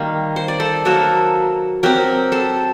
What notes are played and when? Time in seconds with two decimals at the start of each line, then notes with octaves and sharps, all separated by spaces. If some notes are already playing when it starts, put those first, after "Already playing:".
Already playing: D#3 G3 A#3
0.36 C5
0.48 D5
0.60 A4 C5
0.85 F#3 A#3 F#4 A4
1.83 F#3 C4 G4 A#4
2.32 A4 C5